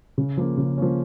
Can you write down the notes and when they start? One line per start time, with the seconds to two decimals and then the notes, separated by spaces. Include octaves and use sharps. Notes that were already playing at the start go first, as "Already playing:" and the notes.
0.18 C#3
0.37 F3 A#3 C#4
0.57 C#3
0.78 F3 A#3 C#4